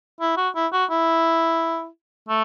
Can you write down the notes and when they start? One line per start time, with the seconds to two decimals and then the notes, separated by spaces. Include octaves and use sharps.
0.20 E4
0.37 F#4
0.55 E4
0.73 F#4
0.90 E4
2.29 A3